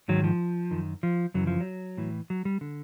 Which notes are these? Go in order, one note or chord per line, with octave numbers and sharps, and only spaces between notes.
G#2 D#3 F#3
F3
F#2 D#3
F3
F#2 C#3 E3 F#3
F3
F#3
A2 E3
F#3
G3
D3